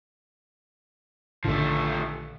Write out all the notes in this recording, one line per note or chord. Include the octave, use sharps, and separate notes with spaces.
A#1 D3 D#3 F3 A3